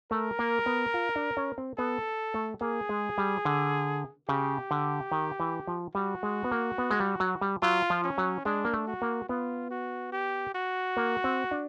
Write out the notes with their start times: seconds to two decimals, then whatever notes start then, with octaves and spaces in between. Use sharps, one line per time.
0.11 A3 A#4
0.39 A#3
0.66 B3
0.94 F4
1.16 D4
1.37 C#4
1.58 C4
1.78 B3 A4
2.34 A3
2.61 A#3 G#4
2.89 G#3
3.18 G3
3.45 D3
4.29 C#3 G4
4.71 D3
5.12 D#3
5.40 E3
5.67 F3
5.95 G3 F#4
6.23 G#3
6.44 B3
6.52 A#3
6.78 B3
6.91 G#3
7.00 G3
7.20 F#3
7.41 G3
7.62 F#3 F4
7.90 F3
8.04 C#4
8.18 F#3
8.45 G#3 D4
8.65 A#3
8.74 A3
8.87 F#4
9.02 A#3
9.29 B3 F4
9.71 F#4
10.12 G4
10.55 F#4
10.97 A#3
11.24 C4
11.51 D4